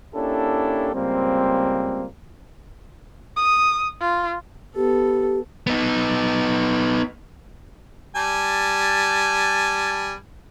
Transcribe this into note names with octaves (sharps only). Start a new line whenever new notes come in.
A#3 C#4 D4 E4 G4 A4
C#2 G3 A#3 C4
D#6
F4
B3 G4 A4
B3 D#4
G3 G#5 A5